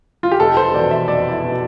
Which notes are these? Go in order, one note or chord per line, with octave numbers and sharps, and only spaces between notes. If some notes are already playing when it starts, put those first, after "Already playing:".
F4
G4
F1 A4
C5
E2 B2 D5
E5
F1 D5
E4
B2